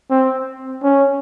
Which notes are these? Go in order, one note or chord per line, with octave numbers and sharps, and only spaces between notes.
C4
C#4